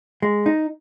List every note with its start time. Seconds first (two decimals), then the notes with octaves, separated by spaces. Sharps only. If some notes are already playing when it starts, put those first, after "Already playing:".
0.22 G#3
0.46 D#4